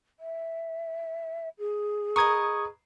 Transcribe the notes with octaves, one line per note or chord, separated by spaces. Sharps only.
E5
G#4
A#4 B4 D#5 C#6 D#6 G#6